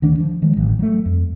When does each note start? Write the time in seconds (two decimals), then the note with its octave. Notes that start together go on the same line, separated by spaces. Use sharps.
0.02 D2 D#3 D4
0.20 F3
0.42 D#3 F#3 G#3
0.57 A1
0.79 F#3 A3
1.06 F2